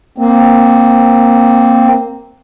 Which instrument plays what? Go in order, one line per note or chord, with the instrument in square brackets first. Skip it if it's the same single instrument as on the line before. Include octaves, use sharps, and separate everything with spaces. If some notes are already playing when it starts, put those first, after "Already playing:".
[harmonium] A#3 C4